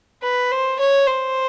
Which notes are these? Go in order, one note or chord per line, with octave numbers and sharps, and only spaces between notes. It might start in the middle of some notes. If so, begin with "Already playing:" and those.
B4
C5
C#5
C5